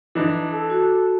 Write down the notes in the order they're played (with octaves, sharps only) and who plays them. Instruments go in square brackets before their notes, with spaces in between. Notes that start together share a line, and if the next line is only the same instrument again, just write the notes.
[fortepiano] E3 D4 D#4
[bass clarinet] A4
[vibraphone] F#4